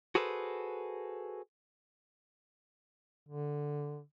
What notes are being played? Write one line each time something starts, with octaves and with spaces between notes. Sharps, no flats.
F#4 G#4 A4 B4 C5
D3